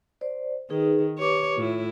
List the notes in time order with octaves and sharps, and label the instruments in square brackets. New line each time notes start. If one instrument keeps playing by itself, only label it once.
[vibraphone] C5 D5
[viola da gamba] D#3 [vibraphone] D#4 G#4 B4
[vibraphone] G4 B4 D6 [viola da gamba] C#5
[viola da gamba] A2 E4 [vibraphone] F4